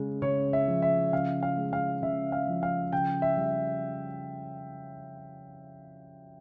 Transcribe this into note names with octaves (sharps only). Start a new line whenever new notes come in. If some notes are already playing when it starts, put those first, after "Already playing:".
Already playing: C#3 G#3
C#3 C#5
E5
F3
E5
C#3 F5
F5
G#3
F5
C#3 E5
F5
F3
F5
C#3 G5
E5
G3